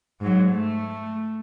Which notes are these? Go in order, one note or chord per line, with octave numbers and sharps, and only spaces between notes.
G#2 F#3
A3